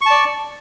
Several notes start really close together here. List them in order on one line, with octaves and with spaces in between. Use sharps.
C#6 A5 D5